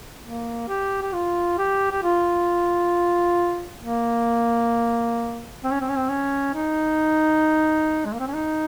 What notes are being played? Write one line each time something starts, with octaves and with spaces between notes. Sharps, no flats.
A#3
G4
G4
F4
G4
G4
F4
A#3
C4
C#4
C4
C#4
C4
C#4
D#4
G#3
A#3
C4
C#4
D#4